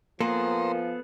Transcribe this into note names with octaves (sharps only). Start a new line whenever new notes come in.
F3 A#3 B3 G#4 A4 C5 A#5 C6